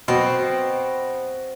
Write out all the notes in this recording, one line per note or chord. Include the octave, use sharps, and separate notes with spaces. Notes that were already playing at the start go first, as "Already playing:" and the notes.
B2 C4